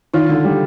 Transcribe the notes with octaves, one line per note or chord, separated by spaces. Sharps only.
D#3 D#4 F4
D3
G3